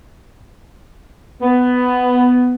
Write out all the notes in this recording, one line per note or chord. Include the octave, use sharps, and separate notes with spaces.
B3